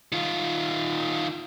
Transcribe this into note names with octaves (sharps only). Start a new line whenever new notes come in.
D#3 F4